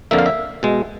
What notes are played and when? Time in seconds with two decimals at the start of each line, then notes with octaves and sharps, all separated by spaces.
0.11 F2 D3 F3 A#3 E5
0.19 F5
0.26 E5
0.63 B2 G#3